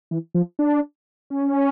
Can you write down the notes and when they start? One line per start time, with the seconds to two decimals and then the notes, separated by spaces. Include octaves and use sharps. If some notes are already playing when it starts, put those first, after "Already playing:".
0.11 E3
0.34 F3
0.59 D4
1.30 C#4